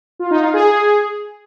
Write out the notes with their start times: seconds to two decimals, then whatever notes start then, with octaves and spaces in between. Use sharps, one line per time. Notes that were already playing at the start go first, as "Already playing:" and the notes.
0.19 F4
0.31 D#4
0.42 F4
0.54 G#4